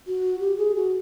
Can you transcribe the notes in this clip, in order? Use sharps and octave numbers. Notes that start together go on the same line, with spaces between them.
F#4
G4
G#4
F#4